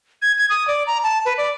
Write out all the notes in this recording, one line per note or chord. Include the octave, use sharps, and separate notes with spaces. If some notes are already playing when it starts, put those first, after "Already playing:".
G#6
G#6
D#6
D5
A#5
A5
B4
D5